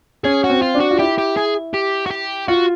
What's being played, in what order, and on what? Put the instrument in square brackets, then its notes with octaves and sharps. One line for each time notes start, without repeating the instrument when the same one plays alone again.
[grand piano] C#4 [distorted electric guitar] G#4
[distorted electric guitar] F#4
[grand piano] C4
[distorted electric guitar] F4
[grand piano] D4
[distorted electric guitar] F#4
[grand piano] F4
[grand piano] E4 [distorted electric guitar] G4
[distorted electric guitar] G4
G#4
G4
F#4
G4
[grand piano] F4 [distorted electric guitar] F#4